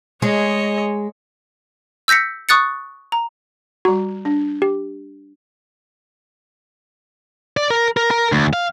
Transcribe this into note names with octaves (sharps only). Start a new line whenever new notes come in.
G#3 C#5 D#5
E6 G6 A#6 B6 C#7
C#6 D#6 F#6 A6 C#7
A#5
G3 F#4 A#5
D4
G4
D5
A#4
A#4
A#4
D2
F5